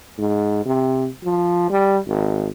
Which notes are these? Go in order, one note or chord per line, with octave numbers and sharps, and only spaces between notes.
G#2
C3
F3
G3
G#1